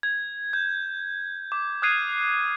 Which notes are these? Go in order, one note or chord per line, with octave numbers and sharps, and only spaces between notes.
G#6
G6
D6
D#6 F6 F#6 G#6 C7 D#7